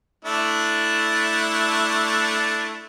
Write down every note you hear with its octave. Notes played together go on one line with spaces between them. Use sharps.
A3 D4 E4